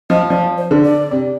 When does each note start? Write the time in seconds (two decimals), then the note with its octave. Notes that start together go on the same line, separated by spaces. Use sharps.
0.10 F3 D#5
0.30 F3 D5
0.57 C5
0.71 D3
0.84 D5
1.11 C3